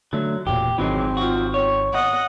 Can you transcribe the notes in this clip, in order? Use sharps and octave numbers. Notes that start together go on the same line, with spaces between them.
D3 F#3 A3
E1 A#2 G4
G#1 D#3 E3 F#3 G#3 C4
F3 F#4
C#5
D#5 F#5